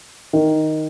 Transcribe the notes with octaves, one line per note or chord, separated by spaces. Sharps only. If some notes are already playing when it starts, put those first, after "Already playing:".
D#3